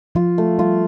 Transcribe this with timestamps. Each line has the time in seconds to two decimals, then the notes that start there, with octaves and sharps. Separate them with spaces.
0.15 F3 F4
0.38 A3
0.59 G3 F4